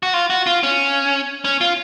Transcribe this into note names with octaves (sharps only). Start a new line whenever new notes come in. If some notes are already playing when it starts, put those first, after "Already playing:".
F#4
F4
F#4
F4
C#4
C#4
F4